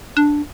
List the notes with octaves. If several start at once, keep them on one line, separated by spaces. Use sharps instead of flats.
D4